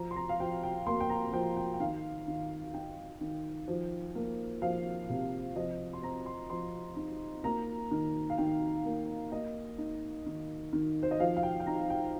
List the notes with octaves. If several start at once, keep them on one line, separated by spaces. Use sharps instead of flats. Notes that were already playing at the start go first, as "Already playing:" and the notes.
Already playing: F3 A#5
C6
A#5
F5
F3 G5
G5
A#3 C6
G5
A#5
F3 G5
G5
G5
D#3 F5
D#3
D#4 G5
D#3
F3
A#3
F3 F5
C3
F3 D#5
C6
C4 A#5
C6
F3 C6
D#4
A#3 A#5
D#3
F5
D#3 G5
A#3
A#3 D#5
D#4
D#3
D#3
C5
D#5
F3 F5
F5
G5
G5
D#4 A#5
G5